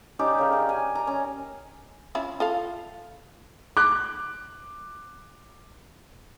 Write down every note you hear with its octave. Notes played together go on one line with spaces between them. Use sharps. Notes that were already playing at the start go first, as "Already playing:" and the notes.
C#4 D#4 G4 D5
C#3 A#4
D5
G#5
D5 A#5
C#4
C#4 E4 F4
F4 A4 F5
D6 F#6